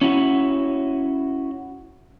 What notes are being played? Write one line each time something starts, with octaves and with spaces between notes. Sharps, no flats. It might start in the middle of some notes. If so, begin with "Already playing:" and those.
C#4 E4 F#4